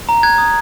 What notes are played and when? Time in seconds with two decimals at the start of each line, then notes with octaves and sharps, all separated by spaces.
0.09 A#5
0.23 F#6 G#6
0.38 D#6